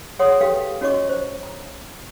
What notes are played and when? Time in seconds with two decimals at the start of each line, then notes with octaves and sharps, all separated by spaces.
0.19 G#4 C#5 F#5 C6 D#6
0.41 G4 A4 B4 F5 G5
0.81 C#4 F#4 C#5 D#5 C#6 D6
1.09 C5
1.43 A#5